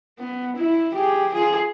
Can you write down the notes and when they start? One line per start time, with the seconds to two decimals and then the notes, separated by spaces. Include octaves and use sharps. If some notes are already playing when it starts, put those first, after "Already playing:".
0.19 B3
0.56 E4
0.94 G4 G#4
1.33 F4 G#4